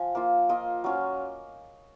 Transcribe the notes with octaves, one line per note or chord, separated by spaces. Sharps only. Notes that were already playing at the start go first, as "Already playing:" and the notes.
Already playing: F3 G#5
A#3 F4
A#3 F4 D#5
F#3 C#4 F4